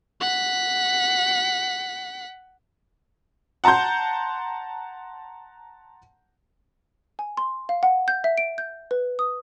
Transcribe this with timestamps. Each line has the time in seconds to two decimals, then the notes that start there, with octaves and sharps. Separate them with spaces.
0.21 F#5 B6
3.64 F#5 A5 A#5 C6 G6
7.19 G#5
7.37 C6
7.69 F5
7.83 F#5
8.08 G6
8.24 E5
8.37 D7
8.58 G6
8.91 B4
9.19 D#6